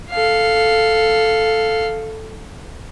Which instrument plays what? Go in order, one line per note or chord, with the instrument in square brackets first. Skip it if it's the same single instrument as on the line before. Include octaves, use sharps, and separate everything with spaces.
[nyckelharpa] A4 F5